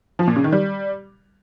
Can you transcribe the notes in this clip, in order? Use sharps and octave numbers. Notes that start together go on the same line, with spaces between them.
F3
A#2
C#3
D#3
G3